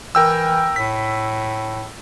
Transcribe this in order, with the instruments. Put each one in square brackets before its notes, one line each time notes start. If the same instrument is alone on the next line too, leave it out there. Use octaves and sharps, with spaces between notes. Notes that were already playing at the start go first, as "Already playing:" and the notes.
[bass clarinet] E3 [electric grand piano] A#4 G5 E6
[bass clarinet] A2 [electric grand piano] B6